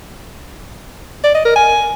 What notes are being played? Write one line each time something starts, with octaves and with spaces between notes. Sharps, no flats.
D5
D#5
A#4
G#5